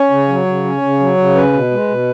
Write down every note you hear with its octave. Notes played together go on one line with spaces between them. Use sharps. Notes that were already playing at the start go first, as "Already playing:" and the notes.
Already playing: C#4 C#5
C#3
F#3
C#3
C#4
C#3
F#3
C#3
C#4 B4
B2
G#3
B2